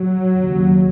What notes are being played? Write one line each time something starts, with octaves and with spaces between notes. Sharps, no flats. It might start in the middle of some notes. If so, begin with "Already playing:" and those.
Already playing: F#3
D#2 C#3